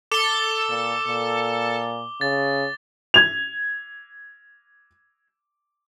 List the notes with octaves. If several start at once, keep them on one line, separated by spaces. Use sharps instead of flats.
A4 A5 D6 G7
A#2
A#2
C#3 A6
G#6 F7